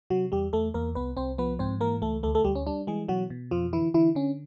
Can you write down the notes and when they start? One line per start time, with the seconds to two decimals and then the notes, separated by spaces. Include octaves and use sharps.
0.10 C3 F#3 F#4
0.32 E2 G3 G4
0.53 E2 A3 A4
0.74 E2 A#3 A#4
0.95 C2 B3 B4
1.17 C2 C4 C5
1.38 F3 B3 B4
1.59 G#2 C4 C5
1.81 E3 A#3 A#4
2.02 C#2 A3 A4
2.23 D2 A3 A4
2.35 A3 A4
2.45 D2 G3 G4
2.55 C#4
2.67 G3 D4
2.87 E3 G#3 G#4
3.08 B2 F#3 F#4
3.30 B2
3.51 F2 F3 F4
3.73 D3 E3 E4
3.94 D3 E3 E4
4.15 D3 C#4